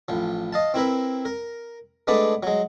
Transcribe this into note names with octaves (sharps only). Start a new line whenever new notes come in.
A1 F3
D#5 F5 A5
C4 E4 A#4 B4
A#4
G#3 A3 B3 D4 B4 D5
F#3 G#3